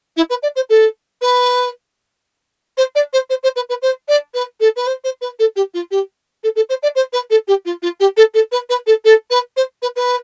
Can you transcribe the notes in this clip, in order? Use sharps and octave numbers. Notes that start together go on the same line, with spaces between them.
E4
B4
D5
C5
A4
B4
C5
D5
C5
C5
C5
B4
B4
C5
D5
B4
A4
B4
C5
C5
B4
A4
G4
F4
G4
A4
A4
C5
D5
C5
B4
A4
G4
F4
F4
G4
A4
A4
B4
B4
A4
A4
B4
C5
B4
B4